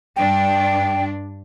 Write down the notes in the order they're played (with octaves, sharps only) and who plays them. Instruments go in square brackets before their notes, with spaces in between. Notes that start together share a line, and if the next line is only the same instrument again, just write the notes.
[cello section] G2 D4 [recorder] G5